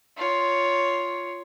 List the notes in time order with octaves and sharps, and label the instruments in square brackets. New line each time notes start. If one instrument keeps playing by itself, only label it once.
[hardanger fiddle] F4 C#5